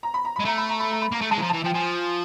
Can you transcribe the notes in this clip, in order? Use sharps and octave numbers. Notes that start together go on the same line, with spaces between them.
A#5
B5
A#5
G#3 B5
A3 A#5
B5
A#5
B5
A#5
B5
A#3 A#5
A3
G#3 A5
E3
F3 A#5
E3 A5
F3 G5
F3 G#5